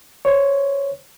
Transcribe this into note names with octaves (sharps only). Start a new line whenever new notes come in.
C5 C#5